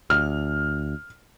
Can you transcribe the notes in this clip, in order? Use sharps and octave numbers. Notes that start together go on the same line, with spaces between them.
D2 F6